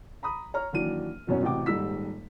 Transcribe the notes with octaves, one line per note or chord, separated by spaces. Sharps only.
A#5 B5 D#6
C#5 A#5 F6
D#2 E3 F#3 D4 D#7
C2 F#2 B2 C#4 C#5
A1 C3 F#4 G5 D6
D#1 G#2 G3 D#4 E6 B6